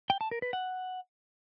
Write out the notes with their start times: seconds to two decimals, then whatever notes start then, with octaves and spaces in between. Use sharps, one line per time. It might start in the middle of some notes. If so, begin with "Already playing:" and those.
0.10 G5
0.21 A5
0.31 A#4
0.42 B4
0.53 F#5